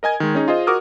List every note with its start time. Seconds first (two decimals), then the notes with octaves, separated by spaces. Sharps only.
0.03 A#4 D#5 G#5 G#6
0.20 D#3 G#3
0.35 C#4 D#4 G#4
0.48 F4 G#4 C5 D#5
0.67 F#4 A#4 D6 D#6 F6